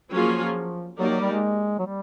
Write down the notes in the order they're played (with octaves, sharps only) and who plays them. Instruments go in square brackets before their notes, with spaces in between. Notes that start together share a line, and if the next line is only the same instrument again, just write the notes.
[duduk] F3 [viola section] F#3 A#3 C#4 F4 G#4
[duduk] F#3 [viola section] A#3 D#4 G4 A#4 D5
[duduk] F#3
G3
G#3
F#3
G3